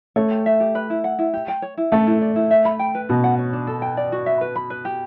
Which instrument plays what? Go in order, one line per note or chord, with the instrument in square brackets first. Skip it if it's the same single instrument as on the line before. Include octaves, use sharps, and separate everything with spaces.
[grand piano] A3 [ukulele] C#5
[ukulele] G4
E5
G4
B4
E4
F#5
E4
G4
G5
C#5
E4
[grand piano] A3 [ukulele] A4
[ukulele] E4
D5
E4
E5
B5
G5
B4
[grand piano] B2 [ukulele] F#4
[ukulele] F#5
C#5
D4
A4
G5
D5
F#4
E5
B4
B5
B4
G4